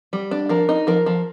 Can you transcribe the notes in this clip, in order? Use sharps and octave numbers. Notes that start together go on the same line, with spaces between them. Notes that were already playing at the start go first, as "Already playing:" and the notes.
G3
D4
F3 A#4
D#4
F3 A#4
F3